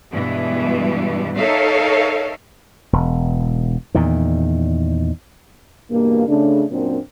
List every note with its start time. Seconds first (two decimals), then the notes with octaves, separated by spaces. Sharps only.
0.12 G2 B2 E3 G#3
1.38 D#4 A4 A#4 C#5 E5 F5
2.93 E1
3.95 E2 A#2 D#3
5.90 E2 G2 B2 A#3
6.28 C#3 A3 D4
6.71 F#2 A#2 C4 D4